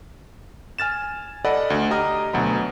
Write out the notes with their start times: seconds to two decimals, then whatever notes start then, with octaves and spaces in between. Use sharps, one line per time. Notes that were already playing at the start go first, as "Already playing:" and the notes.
0.78 G#5 F6 A6 E7
1.45 A4 D5 D#5 F#5 B5
1.70 D2
1.91 G4 D#5 A#5 D#6 F6
2.33 D2 B2 F#3 A#5 B5